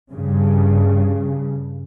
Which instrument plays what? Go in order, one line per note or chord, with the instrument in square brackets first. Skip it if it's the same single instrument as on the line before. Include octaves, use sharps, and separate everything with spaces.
[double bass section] G2 C#3